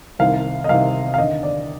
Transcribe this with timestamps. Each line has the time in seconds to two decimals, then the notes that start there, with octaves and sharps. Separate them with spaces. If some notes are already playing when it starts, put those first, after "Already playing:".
0.19 C2 C3 D#3 F5
0.64 D#5
0.69 C2 C3 D#3 F5
1.14 F5
1.18 D#2 D3 D#5
1.43 D5